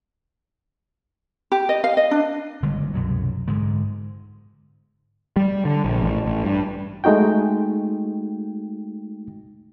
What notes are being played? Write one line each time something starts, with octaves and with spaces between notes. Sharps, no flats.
G4
D#5
F5
D#5
D4
F#1 D3 G3 G#3
C2 F#2 B2 F#3
G#2 D3 G#3
G3
D3
A#1
A1
A1
G2
G#3 A3 D#4 F#4 G5